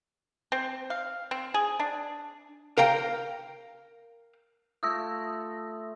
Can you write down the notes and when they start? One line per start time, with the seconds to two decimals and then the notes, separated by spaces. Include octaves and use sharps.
0.52 C4
0.90 F5
1.31 C4
1.54 G#4
1.79 D4
2.78 A#4 F5 G5 A#5
4.83 A3 F4 D#6 E6 A#6